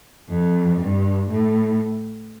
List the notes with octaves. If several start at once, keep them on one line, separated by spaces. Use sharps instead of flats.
F2
G2
A2